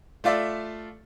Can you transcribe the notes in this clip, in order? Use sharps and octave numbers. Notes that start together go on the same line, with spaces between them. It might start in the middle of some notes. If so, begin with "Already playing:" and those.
A3 F4 D5 E5